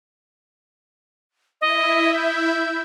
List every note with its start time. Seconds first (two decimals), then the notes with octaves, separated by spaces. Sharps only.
1.61 E4 D#5 E5
2.15 G6